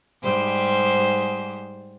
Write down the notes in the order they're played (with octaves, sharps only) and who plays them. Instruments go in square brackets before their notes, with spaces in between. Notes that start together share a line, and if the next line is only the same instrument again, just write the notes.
[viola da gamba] G#2 G3 C5